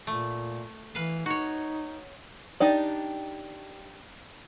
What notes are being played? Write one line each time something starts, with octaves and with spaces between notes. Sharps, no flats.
A#2 A3
E3 B4 F5
D#4 F#4 C#5
D4 D#4 G4 D5